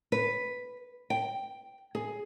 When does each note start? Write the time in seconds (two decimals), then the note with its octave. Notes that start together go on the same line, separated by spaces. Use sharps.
0.12 B4
1.10 G5
1.95 G#4